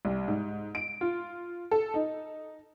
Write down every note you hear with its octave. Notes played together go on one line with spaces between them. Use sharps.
C2
G#2
D7
F4
A4
D#4